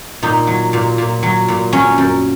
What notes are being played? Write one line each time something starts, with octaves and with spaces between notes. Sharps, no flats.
A#2 D#4
F#3
A#2
A#2
F#3
A#2
F#3 C#4
F#2